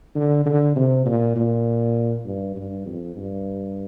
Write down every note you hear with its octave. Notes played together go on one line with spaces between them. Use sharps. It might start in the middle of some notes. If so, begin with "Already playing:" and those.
D3
D3
C3
A#2
A#2
G2
G2
F2
G2